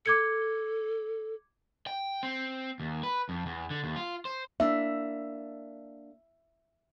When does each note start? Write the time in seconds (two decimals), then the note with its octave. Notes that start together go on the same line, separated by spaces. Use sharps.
0.06 A4 D6 G#6 C#7
1.87 G5
2.23 C4
2.80 D#2
3.03 B4
3.29 F2
3.46 E2
3.71 D3
3.84 D#2
3.96 F4
4.25 C5
4.60 A#3 D4 E5